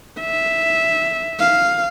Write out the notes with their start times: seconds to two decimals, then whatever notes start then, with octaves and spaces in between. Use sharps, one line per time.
0.20 E5
1.40 F5